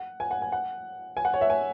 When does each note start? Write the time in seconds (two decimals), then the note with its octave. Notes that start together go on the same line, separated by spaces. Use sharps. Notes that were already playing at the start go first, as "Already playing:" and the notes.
Already playing: F#5
0.20 G#5
0.31 F#5
0.42 G#5
0.52 F#5
1.17 G#5
1.25 F#5
1.34 C#5
1.41 E5
1.50 G#5